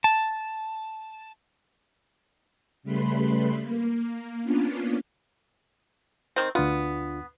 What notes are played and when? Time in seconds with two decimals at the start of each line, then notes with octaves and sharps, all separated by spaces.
0.04 A5
2.83 C#3 G3 A3 B4 B5 C6
3.61 A#3
4.42 A#3 B3 C#4 D4 F4
6.36 D#3 C4
6.55 D2 B3 D4 F4